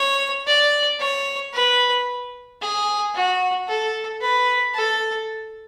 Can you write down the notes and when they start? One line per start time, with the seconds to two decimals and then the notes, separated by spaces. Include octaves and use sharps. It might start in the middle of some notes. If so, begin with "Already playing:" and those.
Already playing: C#5
0.47 D5
1.00 C#5
1.53 B4
2.61 G#4
3.15 F#4
3.68 A4
4.21 B4
4.75 A4